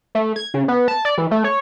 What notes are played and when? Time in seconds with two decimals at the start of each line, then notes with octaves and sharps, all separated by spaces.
0.15 A3
0.36 G#6
0.54 C#3
0.68 B3
0.88 A5
1.05 D5
1.18 E3
1.31 A3
1.44 C#5